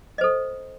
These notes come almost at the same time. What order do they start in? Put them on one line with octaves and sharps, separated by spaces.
D#5 C5 A4